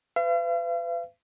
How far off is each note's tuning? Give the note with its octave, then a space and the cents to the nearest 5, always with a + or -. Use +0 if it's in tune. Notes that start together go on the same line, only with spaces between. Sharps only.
B4 +40 F5 -45